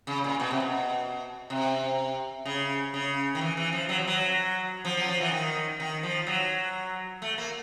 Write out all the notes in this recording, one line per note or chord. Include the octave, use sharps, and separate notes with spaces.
C#3
A#2
B2
C3
B2
C3
C#3
C#3
D#3
E3
E3
F3
F#3
F3
F#3
F3
F#3
F3
E3
D#3
D#3
F3
F#3
A3
A#3